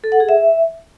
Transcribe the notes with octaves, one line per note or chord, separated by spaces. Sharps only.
A4
F#5
G#4
E5